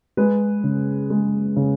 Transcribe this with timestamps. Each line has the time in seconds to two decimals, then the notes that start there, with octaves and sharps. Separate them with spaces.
0.17 G#3 B4
0.64 C#3
1.10 G#3
1.56 C#3